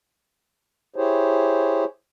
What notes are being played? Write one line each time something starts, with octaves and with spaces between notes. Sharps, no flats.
E4 G4 G#4 C5 C#5